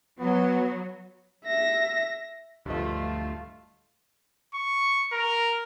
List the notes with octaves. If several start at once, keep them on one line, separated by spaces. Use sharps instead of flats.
F#3 B3
E5 A#6
D1 D2 G2 F3 G3 A3 F4 D#5
C#6
A#4